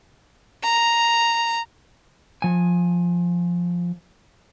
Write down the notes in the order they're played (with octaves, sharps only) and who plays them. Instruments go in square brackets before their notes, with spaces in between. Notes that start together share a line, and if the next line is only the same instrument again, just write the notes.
[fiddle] A#5
[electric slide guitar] F3 G#5